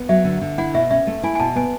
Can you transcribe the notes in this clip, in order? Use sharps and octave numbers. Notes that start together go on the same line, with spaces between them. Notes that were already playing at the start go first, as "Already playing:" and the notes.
Already playing: B3
F#3 E5
D3
D3
E4 F#5
B2 E5
C#4 E5
A3
E4 G#5
G#5
B2 A5
B3 G#5